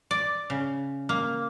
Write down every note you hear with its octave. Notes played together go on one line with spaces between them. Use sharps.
D5
C#3
A#3